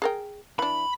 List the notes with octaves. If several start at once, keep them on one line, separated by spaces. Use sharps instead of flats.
G#4 A#4 G5
E3 D4 B5